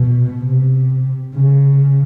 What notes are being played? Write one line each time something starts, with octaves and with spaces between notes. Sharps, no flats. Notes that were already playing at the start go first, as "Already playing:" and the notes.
Already playing: B2
C3
C#3